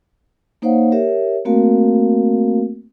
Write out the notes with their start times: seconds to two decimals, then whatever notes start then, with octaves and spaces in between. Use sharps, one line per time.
0.62 A#3 D#4 C5 C#5 F5 F#5
0.92 G4 A#4 C#5 E5
1.45 A3 A#3 C4 F#4 A#4 F5